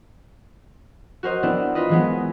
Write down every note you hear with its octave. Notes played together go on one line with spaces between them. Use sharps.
F#4 A#4 C5 D#5
B3 C4 D4 E4
F4 A#4 B4 D#5
E3 G#3 B3